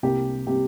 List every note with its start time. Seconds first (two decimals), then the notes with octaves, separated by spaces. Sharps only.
0.03 C2 C3 G3 A#3 G4
0.47 C3 G3 A#3 G4